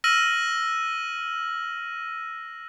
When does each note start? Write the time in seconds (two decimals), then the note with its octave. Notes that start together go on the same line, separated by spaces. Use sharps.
0.04 E6 F6 A#6 D#7 F#7